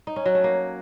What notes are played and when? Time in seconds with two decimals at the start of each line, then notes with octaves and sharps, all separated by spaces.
0.07 D#4
0.16 C#4
0.26 F#3
0.35 A3
0.44 A#3